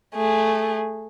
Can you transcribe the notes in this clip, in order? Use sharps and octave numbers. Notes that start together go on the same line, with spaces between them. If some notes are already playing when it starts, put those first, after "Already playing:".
A3 G#4